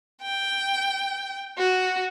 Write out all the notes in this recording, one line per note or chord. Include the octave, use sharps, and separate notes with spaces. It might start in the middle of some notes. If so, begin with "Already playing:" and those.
G5
F#4